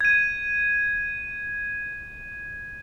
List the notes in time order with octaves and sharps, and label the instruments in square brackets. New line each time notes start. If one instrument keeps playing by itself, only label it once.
[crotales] G#6 D#7